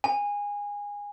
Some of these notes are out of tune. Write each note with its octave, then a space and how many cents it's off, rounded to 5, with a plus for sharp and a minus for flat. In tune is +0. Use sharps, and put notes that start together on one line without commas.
G#5 -20